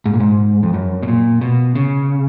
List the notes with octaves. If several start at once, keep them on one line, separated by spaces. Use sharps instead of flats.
G#2
A#2
G#2
F2
F#2
B2
A#2
B2
C#3